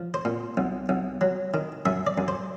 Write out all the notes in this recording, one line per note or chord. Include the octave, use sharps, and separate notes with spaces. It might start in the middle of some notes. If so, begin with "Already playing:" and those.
Already playing: F3
C5
A#2
B1
B1
F#3
D#3
F#2 E5
D5
F#2
C5